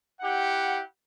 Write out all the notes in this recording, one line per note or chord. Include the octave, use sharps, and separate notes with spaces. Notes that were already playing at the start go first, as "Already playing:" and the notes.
E4 G4 F#5